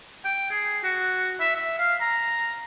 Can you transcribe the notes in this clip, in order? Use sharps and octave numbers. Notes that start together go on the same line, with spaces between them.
G5
G#4
F#4
E5
E5
F5
A#5